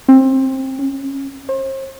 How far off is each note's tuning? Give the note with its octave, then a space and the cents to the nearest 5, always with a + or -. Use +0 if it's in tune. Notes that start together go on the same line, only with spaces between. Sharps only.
C4 +20
C#4 -20
C5 +40